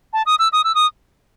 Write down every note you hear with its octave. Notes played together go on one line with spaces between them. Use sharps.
A5
D#6
E6
D#6
E6
D#6